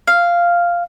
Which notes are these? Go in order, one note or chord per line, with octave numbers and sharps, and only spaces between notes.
F5